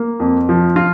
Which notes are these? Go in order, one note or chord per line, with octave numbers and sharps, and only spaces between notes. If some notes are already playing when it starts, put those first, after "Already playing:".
Already playing: A#3
F2
F3
F4